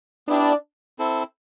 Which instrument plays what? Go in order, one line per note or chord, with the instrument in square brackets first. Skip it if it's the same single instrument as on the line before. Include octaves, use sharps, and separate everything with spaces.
[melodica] B3 E4 G4 [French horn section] D4
[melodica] C4 E4 A4